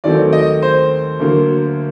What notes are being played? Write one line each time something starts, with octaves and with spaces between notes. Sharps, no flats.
D#2 D#3 F#3 A3 C4 D5
D#5
C5
D2 D3 F#3 A#3